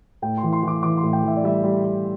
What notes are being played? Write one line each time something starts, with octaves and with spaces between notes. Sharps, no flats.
A2 G5
C6
E3
C6
E3 D6
E3 D6
C6
A2
G5
E3 E5
D5
G3 E5
G3
G3